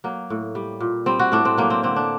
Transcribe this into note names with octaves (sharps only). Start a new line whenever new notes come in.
F#3 A#3
A2
G3
A#2
G3 C4
F#4
A2 D4
C4
F#3 A#3
C4
D3 C4
D4